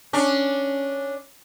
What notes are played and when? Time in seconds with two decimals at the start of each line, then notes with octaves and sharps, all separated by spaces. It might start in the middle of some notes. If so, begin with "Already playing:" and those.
0.13 C#4 D4